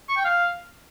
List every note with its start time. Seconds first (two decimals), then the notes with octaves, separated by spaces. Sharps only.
0.09 C#6
0.17 G5
0.24 F5